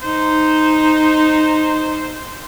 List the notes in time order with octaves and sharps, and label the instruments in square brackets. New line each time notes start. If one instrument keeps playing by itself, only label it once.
[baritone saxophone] D#4 [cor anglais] C5